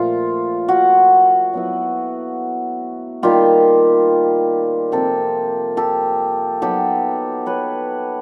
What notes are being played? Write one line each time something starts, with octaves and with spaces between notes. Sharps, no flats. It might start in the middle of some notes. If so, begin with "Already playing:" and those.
Already playing: A#2 F3 A3 F4
F#4
F#3 B3 E4
D#3 G3 A#3 F4 G4
C3 F3 A#3 G4 A4
G4 A4
F#3 B3 D#4 G4 A4
B4 C#5